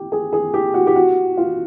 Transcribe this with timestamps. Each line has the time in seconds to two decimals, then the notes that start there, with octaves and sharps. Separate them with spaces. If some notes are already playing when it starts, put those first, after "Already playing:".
Already playing: G4
0.12 G#4
0.33 G#4
0.54 G4
0.74 F#4
0.87 G4
0.96 F#4
1.37 F4